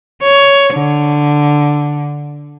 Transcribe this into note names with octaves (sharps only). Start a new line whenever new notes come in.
C#5
D3